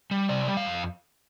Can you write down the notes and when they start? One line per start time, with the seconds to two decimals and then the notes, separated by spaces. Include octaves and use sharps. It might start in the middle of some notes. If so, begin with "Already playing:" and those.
0.11 G3
0.29 C3 D5
0.48 G3
0.57 F5
0.66 F2